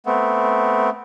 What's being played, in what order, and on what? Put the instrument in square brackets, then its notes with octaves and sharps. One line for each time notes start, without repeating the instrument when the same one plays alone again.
[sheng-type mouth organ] A3 B3 C4